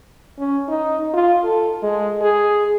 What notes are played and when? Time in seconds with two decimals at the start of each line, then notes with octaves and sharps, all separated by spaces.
0.39 C#4
0.68 D#4
1.13 F4
1.44 A4
1.82 G#3
2.21 G#4